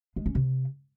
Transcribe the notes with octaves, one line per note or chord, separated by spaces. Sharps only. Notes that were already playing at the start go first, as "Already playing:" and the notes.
G#3
C#4
C3